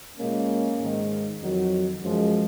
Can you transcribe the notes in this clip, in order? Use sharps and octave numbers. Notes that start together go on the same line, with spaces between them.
A#2 G#3 A#3 C#4
G#2 D#3 G#3
F2 D#3 F#3
F#2 F3 G#3